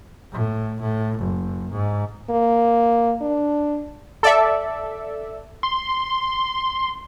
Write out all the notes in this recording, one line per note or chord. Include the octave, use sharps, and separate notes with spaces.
A2
A2
F#1
G#2
A#3
D4
A4 D5 E5
C6